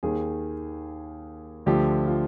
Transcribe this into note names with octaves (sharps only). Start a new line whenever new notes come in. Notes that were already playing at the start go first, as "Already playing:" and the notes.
D#2 D#3 G#4
D2 D3 F3 G4
F4